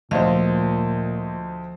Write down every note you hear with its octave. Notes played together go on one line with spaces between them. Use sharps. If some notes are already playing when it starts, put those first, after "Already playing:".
D2 A#2 F3 C5 D#5 F5